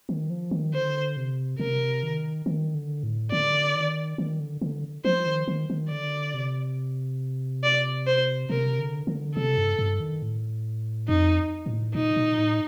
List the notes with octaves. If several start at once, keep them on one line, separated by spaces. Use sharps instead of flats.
D#3
F3
D#3
D3 C5
C3
C3 A#4
D#3
D#3
D3
A2
D3 D5
D#3
D#3
D3
D3
F3 C5
D#3
D#3
D#3
D3 D5
C3
D5
C5
C3 A#4
D3
D3
C3 A4
G2
G2
D#3
A2
F2 D#4
A2
A#2 D#4
A#2
A2